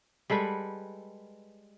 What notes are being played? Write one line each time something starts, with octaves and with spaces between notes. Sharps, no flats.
G3 G#3 A4 B4